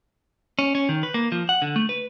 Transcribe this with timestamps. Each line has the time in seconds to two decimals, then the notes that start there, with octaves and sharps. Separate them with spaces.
0.59 C#4
0.75 C#4
0.89 D#3
1.03 B4
1.14 A#3
1.32 F3
1.49 F#5
1.62 D3
1.76 A3
1.89 B4